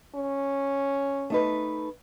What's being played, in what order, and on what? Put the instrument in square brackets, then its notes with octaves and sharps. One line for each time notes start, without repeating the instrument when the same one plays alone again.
[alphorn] C#4
[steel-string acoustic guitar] A3 D#4 B4